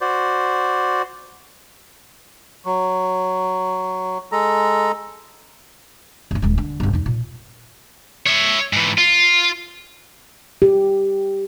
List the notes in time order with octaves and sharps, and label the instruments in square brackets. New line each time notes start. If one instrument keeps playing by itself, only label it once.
[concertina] F#4 C5 D5
[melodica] F#3
G#3 A4 A#5
[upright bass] G1 A#3
D#1 G#3
D3
G1 F#2
E2 D#4
A#2
[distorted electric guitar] C#5 E5
G#2 E3
F4
[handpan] G4